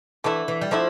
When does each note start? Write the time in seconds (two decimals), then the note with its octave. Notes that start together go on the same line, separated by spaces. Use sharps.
0.24 D3 E3 A3 E4
0.48 E3
0.61 G3
0.71 D3 F3 A3 E4